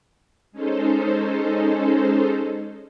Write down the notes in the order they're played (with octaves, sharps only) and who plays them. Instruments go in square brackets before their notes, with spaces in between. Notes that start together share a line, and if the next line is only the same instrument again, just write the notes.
[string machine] G#3 C#4 D#4 A4 C5